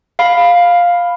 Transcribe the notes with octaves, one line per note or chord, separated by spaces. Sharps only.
F5 B5